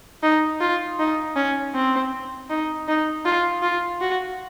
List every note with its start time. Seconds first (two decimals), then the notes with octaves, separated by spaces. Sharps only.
0.23 D#4
0.60 F4
0.99 D#4
1.36 C#4
1.75 C4
2.50 D#4
2.88 D#4
3.25 F4
3.62 F4
4.01 F#4